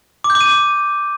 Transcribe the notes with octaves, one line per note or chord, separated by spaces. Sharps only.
D6
G6
D6
D#7